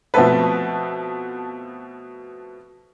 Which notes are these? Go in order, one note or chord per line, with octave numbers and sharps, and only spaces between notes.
B2 F3 A3 C4 A4 B4